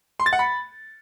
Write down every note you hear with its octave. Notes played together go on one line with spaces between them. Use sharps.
C6
A6
F#5
B5